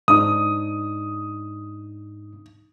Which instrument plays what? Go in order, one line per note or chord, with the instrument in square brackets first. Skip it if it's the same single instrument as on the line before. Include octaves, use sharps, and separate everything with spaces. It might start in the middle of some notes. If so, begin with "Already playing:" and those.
[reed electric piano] G#2 D4 D#4 [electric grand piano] D#6